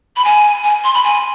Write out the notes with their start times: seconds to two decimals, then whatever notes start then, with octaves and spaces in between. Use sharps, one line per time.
0.16 B5
0.25 G#5
0.64 G#5
0.84 C6
0.94 B5
1.04 G#5